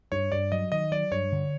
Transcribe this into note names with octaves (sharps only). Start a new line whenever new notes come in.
G2 C#5
G2 D5
F#3 D#5
D#3 D#5
F#3 D5
G2 C#5
D3